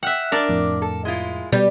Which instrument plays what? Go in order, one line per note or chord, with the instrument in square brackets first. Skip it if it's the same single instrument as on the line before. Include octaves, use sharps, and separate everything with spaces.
[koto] E5 F#5 [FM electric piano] G5 F6 F#6
[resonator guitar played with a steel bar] D4 [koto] A#4 D5 A5
[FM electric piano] F2 A2
[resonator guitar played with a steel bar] A4
G#3 E4 F4
[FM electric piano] B2 [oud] G3 [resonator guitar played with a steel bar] G4 B4